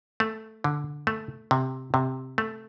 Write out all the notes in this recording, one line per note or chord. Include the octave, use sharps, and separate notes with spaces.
A3
D3
A3
C3
C3
A3